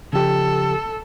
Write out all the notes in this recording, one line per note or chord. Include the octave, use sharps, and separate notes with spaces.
C#3 F3 G4 A4